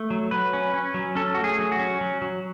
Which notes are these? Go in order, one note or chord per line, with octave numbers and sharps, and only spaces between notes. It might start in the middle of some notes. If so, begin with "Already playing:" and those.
Already playing: A3
F#3
F#3 B4
C#4
C#4
F#3
C#4 A4
A3 F#4
G#4
F#3
F#4
C#4
F#3
F#3